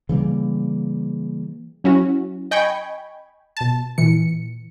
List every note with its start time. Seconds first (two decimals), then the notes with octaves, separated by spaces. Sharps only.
0.09 C#3 E3 G3 A#3
1.84 F#3 C#4 E4 F#4
2.51 D#5 G5 G#5 B5 C#6 G#6
3.57 B2 A5
3.98 A#2 E3 C#7